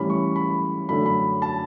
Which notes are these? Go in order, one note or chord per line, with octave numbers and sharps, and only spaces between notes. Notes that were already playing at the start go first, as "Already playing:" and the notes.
Already playing: A2 E3 G3 C#4 B5
C#6
B5
F#2 D3 A3 D4 B5
B5
A5